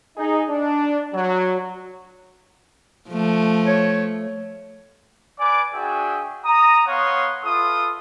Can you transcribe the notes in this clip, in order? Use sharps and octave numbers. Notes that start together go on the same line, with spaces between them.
D#4 G#4
D4
F#3
F3 A3
C#5
B4 D5 G#5 D6
D4 F#4 G#4 E5 G5 G#5
A#5 D#6
B3 C#5 F5 F#5 C6 D#6
F4 A4 B4 E5 C6 D#6